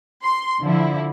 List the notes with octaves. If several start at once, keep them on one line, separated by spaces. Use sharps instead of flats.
C6
D3 F3 E4